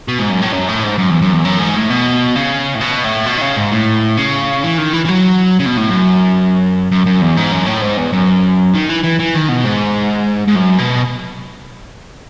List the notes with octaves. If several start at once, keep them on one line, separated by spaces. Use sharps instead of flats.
B2
G#2
F#2
A2
F#2
A2
G#2
F#2
E2
F#2
E2
F#2
G#2
A2
B2
C#3
A2
B2
A2
B2
D#3
C#3
G#2
A2
C#3
E3
D#3
E3
E3
F#3
C#3
B2
A2
F#2
F#2
F#2
E2
G#2
F#2
A2
G#2
E2
F#2
D#3
E3
E3
E3
D#3
B2
G#2
G#2
F#2
B2